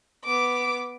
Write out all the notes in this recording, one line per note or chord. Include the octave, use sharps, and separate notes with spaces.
B3 D6